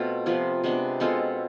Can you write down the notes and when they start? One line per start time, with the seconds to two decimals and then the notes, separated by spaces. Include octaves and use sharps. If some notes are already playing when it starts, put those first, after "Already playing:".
Already playing: B2 A3 C4 F4
0.26 C3 F3 B3 F4
0.64 C3 G#3 B3 D4
1.00 B2 G#3 C4 F4 A4